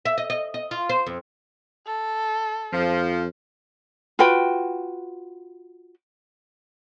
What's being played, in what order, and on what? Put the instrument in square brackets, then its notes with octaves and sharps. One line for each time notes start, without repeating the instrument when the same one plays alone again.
[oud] E5
D#5
D#5
D#5
F4
C5
F2
[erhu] A4
[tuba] F2 [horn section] F3
[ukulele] F4 F#4 B4 G5